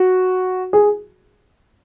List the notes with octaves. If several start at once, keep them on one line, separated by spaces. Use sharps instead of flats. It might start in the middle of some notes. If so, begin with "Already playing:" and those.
Already playing: F#4
G#4